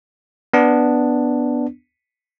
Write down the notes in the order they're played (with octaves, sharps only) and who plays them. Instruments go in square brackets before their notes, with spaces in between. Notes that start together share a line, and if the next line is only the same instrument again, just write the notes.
[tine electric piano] B3 D4